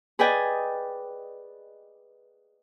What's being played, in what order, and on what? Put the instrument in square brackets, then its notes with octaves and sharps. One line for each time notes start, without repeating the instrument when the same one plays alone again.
[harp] G#4 B4 D5 D#5 G5 G#5